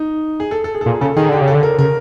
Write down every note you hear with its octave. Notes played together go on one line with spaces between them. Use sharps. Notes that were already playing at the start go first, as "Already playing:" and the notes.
Already playing: D#4
G#4
A4
A4
G#4
A4
A#2 G#4
C#3 A4
D#3 G#4
D3 G4
C#3
A4
D3
A#4
C#3 A#4